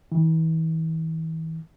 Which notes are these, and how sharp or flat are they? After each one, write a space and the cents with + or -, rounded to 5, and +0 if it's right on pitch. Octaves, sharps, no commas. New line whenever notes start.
E3 -40